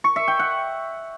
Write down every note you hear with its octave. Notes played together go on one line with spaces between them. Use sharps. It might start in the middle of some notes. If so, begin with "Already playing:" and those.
C#6
E5
G5
F#5